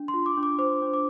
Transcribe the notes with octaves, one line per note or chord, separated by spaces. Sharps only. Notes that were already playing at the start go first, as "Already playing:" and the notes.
Already playing: D4
C6
F4
D6
D4
D6
C5 D6
D4
D6